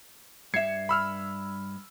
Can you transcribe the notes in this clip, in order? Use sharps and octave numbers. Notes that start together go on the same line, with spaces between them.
G2 E5 G#6 C7 C#7
B5 E6 F6